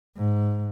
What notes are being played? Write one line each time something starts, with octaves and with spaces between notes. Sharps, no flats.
G#2